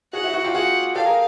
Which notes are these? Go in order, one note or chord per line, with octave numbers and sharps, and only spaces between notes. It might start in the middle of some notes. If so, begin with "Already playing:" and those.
F#4 G#4 F#5
E4 F#4
E4 F#4
F4 G4
F#4 G#4 F#5
G4 A4 F5
G#4 A#4